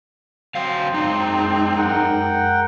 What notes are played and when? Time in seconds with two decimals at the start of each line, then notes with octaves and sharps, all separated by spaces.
0.55 F#3 C4 F5
0.94 F#2 G#3 D4 D#4
1.77 A#4 F#5 G5